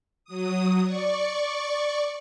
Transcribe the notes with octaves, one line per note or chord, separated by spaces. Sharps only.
F#3 D#6
D5 C#6